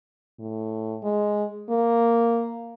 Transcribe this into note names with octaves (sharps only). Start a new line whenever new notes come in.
A2
G#3
A#3